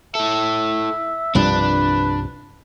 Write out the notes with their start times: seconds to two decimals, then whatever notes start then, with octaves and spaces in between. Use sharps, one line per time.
0.15 E4 A4 E5
1.35 C2 G2 F3 D4 B4